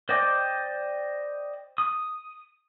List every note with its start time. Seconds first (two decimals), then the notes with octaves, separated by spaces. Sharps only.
0.09 C5 D5 D#5 G5 D6
1.78 D#6